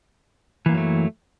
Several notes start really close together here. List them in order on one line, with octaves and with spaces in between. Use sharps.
E3 A#3 F#2 F#3 A3